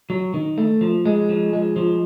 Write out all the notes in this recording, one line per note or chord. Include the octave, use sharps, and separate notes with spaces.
F#3
D#3
A3
F3
G#3
F3
G#3
F3